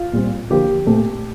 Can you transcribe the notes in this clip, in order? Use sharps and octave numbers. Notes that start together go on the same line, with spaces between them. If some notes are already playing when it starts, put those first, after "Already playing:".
Already playing: F4
A#2 G3 C4
D3 F3 A#3 G4
A#2 A3 C4